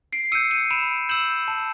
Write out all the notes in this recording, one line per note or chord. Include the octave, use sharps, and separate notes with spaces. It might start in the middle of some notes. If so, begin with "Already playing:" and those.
C7 D7
E6 G6 C#7 D#7
C#7 D#7
B5 D7 E7
E6 G6 E7 F#7
A5